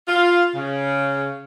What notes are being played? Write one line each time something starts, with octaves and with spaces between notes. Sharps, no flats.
F4
C#3